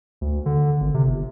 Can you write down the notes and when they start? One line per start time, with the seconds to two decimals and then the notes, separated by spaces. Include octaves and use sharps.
0.21 D2
0.46 D3
0.80 G#1
0.94 C3
1.07 G1